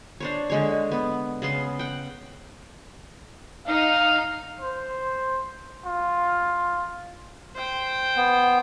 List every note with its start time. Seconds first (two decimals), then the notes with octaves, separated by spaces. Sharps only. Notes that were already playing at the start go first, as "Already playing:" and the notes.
0.20 D4 C5 C#5
0.50 D3 G#3 C#5
0.92 B3
1.42 C#3 B3 C6
1.79 F#5 G5
3.67 D#4 F5
4.60 C5
5.86 F4
7.56 C5 G5
8.16 B3